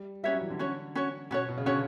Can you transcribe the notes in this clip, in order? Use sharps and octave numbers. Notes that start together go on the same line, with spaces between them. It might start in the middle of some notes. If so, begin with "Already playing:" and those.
Already playing: G3
G3 C#4 F#4 C#5 E5
F#3
E3
D3
C#4 F#4 C#5
C#4 F#4 C#5
B2 C#4 F#4 C#5
B2
C#3
D3 C#4 F#4 C#5